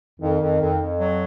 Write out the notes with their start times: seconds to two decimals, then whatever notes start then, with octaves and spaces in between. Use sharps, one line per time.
0.20 F2 D#3
0.41 F2
0.60 F2
0.80 F2
1.00 F#3